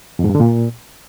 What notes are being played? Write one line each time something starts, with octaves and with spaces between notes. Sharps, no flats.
F2
G#2
G2
D3
A#2